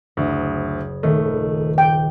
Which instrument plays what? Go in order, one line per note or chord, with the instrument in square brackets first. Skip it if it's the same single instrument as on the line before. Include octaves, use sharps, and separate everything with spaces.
[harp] F#1 D#6 [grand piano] D2
[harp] D#1 D#3 [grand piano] A3
[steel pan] G5